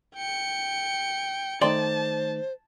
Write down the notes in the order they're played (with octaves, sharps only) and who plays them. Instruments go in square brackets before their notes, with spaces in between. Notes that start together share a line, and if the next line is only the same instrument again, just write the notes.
[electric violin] G5 C#7
[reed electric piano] D#3 A3 D#4 [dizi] C5 [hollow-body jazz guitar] D5 G5 C6 [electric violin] A5